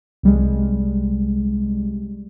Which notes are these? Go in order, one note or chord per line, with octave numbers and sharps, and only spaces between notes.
C2 G3 G#3